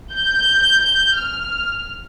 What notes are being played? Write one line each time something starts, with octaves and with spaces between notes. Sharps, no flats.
G6
F6